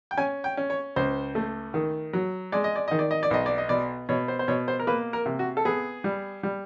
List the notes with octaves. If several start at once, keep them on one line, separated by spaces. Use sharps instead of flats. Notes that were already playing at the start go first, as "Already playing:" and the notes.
G5
C#4 G#5
G5
C#4
C#5
C#2 C5
A3
D#3
F#3
G#3 D5
D#5
D5
D#3 D#5
D5
D#5
D5
B1 D#5
D5
D#5
B2 D5
B2 C#5
C5
C5
B2 C#5
C5
A#4
A#3 B4
A#4
C3
F#4
A4
B3 G#4
G3
G3